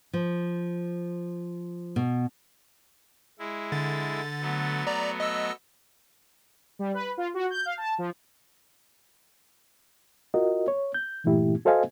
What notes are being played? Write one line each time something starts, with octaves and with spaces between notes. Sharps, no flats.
F3
B2
G#3 E4
D3 A6
F#3 A3 B3
D5 A#5
D#5 E6
G3
B4
F4
F#4
G6
F5
A5
F3
F4 F#4 A#4 D#5
C#5
G6
G2 A#2 E3 A3 E4 G4
F#4 A4 C5 D#5 F5 G#5